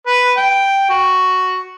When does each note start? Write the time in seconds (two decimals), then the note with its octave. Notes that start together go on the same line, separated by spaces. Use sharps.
0.07 B4
0.37 G5
0.90 F#4